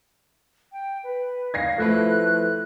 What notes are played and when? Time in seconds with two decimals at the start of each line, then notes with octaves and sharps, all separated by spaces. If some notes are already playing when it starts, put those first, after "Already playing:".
0.72 G5
1.04 B4
1.54 F5 G#6 A#6 C7
1.78 F3 A3 E4 B4 F#6